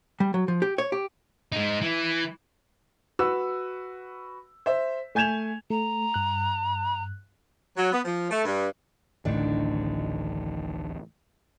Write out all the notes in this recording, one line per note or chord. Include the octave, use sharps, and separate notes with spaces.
G3
F#3
F3
G4
C#5
G4
G#3 D#4
E3
F#4 B4 E6
C5 E5
A3 G#5 G6 G#6 E7 F7
A3 A#5
G2 F#6
F#3
B3
F3
A3
G2
D1 A1 A2 D3 D#3 D4